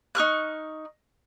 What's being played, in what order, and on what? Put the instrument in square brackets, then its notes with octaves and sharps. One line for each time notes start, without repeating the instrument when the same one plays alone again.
[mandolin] D#4 C#6 F6 F#6